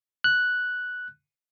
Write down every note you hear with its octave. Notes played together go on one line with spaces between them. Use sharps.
F#6